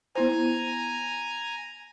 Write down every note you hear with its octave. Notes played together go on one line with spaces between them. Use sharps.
B3 E4 C5 G#5 A#5